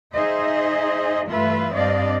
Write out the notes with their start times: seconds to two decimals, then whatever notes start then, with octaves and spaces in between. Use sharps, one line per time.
0.14 D#4 G#4 C5 D#5 E5
1.28 G2 E3 A3 F4 B4 E5
1.73 G2 C4 D4 D5 D#5 F5